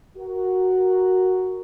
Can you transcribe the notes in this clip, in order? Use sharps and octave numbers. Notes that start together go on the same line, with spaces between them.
F#4 A#4